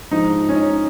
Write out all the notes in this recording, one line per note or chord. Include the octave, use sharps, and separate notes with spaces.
G#2 F3 D#4
C#4
D#4